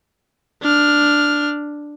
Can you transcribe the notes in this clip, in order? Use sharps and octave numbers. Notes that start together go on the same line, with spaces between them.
D4 F6